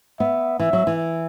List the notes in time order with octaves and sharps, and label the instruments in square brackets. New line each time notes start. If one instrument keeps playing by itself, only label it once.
[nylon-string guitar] B3 [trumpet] E5
[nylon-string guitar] E3 [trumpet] E5
[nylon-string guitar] F#3
E3